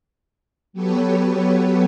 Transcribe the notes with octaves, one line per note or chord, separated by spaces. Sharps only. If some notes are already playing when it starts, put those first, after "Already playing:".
F#3 B3 G4 A4 B4 C#5